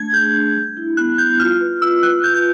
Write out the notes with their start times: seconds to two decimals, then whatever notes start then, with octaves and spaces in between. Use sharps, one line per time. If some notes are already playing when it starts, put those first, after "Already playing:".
Already playing: A3 D4 G#6
0.13 G#4 G6
0.34 D4
0.56 G3
0.77 E4
0.97 B3 F#6
1.18 G3 G6
1.40 F4 F6
1.61 B4
1.82 F4 E6
2.03 B4 F#6
2.24 F4 G6
2.34 G6